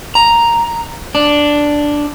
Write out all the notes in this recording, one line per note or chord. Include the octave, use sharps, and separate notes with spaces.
A#5
D4